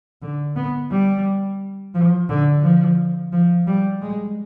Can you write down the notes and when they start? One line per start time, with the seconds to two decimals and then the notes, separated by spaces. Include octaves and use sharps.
0.22 D3
0.56 B3
0.91 G3
1.95 F3
2.29 D3
2.63 F3
3.32 F3
3.67 G3
4.01 G#3